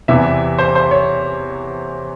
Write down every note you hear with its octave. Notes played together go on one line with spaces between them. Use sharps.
E2 C3 E3 E5
C5
C5
C#5